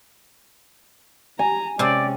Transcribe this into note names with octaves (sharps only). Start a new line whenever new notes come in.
G#5 A#5
C3 G#3 C#4 D5